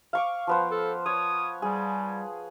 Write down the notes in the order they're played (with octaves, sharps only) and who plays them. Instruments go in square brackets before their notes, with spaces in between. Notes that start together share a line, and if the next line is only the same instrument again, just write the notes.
[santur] F5 C#6 D6
F3 B3 C5
[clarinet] A4
[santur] C#5 [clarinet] D#6
[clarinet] G3 [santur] G#4